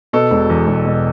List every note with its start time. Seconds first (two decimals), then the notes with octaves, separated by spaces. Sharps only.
0.13 B2 A4
0.31 E1
0.50 E2
0.67 E1
0.85 B2